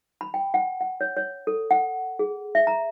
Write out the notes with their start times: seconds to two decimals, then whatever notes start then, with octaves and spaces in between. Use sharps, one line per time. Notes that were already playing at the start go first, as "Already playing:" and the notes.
0.21 B5
0.34 G5
0.54 F#5
0.81 F#5
1.01 C#5
1.17 C#5
1.47 A4
1.71 F#5
2.19 G#4
2.55 E5
2.67 A#5